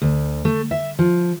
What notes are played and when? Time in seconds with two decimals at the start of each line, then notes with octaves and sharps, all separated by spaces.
0.02 D2
0.45 A3
0.71 E5
0.99 F3